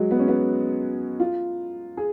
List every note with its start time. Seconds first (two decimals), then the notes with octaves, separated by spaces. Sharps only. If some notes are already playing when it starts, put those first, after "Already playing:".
Already playing: F#3 G#3
0.11 B3
0.19 C#4
0.28 B3
1.20 F4
1.97 G#4